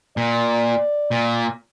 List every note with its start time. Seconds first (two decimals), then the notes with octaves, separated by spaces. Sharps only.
0.17 A#2 D5
1.11 A#2